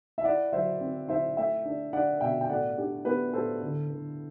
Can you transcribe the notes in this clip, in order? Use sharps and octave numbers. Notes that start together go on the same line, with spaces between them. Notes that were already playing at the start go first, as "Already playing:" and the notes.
E5
E4 D5 F#5
F#3 C5 E5
C4
E4 C5 E5
A3 E5 G5
D4
D4 D5 F#5
B2 E5 G5
G5
A2 D5 F#5
D4 G4
B3 G4 B4
A2 A4 C5
D3
D3